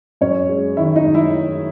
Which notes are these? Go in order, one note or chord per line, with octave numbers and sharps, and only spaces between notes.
F#2 C#4 C#5
G#3
D#3 E4 E5
D#4 D#5
F#2
E4 E5